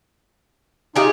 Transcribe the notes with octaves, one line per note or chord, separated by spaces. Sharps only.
D#4 F4 G4 G#4